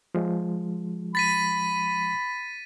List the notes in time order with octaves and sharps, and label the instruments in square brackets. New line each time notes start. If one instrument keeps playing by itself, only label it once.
[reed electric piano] F3 G#3
[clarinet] B5 [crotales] A6 B6 D#7